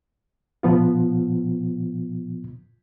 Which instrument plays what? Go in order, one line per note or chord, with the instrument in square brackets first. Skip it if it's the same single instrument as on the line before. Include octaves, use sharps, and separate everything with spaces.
[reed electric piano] A#2 F3 B3 F4